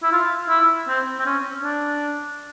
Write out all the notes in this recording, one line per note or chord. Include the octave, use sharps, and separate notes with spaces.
E4
F4
E4
C4
C4
C#4
D4